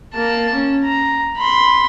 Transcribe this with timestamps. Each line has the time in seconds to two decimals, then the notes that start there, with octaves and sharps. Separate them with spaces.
0.14 A#3 A5
0.54 C#4
0.85 A#5
1.37 B5 C6